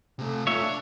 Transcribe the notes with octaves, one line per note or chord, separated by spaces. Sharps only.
C3 A3
A3 F4 C#5 E5
D4